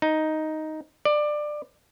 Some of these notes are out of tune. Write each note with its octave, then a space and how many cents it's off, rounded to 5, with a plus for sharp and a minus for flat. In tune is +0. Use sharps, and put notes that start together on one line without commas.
D#4 +5
D5 +20